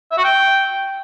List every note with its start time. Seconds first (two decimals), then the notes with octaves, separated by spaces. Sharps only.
0.11 E5
0.18 F#4
0.24 G5